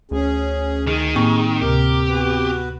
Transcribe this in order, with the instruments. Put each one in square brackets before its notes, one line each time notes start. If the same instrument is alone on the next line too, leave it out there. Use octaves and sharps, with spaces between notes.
[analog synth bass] D2 [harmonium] C#4 G#4
[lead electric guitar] D#3 [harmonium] G#4 [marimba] F6
[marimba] A2 A#3 C#6 [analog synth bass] C4
[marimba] D2 C3 [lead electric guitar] G4 [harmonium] A#4
[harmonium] B3 F#4 B4